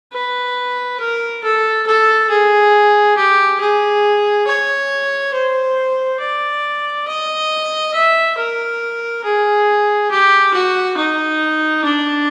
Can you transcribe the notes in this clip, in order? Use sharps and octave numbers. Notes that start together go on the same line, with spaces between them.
B4
A#4
A4
A4
G#4
G4
G#4
C#5
C5
D5
D#5
E5
A#4
G#4
G4
F#4
D#4
D4